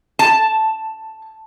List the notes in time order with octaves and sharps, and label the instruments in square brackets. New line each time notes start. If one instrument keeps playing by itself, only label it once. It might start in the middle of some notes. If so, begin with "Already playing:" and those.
[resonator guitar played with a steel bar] A5